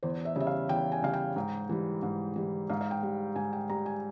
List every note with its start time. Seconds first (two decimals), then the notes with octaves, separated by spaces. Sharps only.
0.03 E2 C5
0.25 E5
0.36 C#3 G3 E5
0.47 F5
0.69 E2 G5
0.92 G#5
1.02 C#3 G3 F5
1.13 G5
1.36 G#2
1.69 E3 G3
2.03 G#2
2.36 E3 G3
2.70 G#2 F5
2.81 F5
2.91 G5
3.03 G3
3.35 G#2 G#5
3.53 G5
3.69 G3 A#5
3.86 G#5